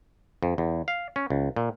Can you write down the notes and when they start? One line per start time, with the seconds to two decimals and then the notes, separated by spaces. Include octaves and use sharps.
0.43 F2
0.58 E2
0.88 F5
1.16 C#4
1.30 C#2
1.56 A#2